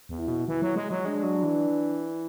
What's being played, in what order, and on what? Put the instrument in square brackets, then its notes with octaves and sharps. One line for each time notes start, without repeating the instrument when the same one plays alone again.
[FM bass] E2
[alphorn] E4
[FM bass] B2
[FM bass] E3 [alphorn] E4
[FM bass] F#3
G#3
F#3
[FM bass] G#3 [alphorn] D4
[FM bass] F#3
E3